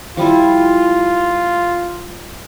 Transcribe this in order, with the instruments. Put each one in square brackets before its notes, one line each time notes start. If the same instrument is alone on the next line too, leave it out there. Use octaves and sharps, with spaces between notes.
[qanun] F3 G3 E4 [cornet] F4